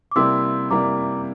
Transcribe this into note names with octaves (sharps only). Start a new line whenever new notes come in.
D6
C3 G3 A#3 E4 C6 E6
C3 G3 A#3 E4 A#5 D6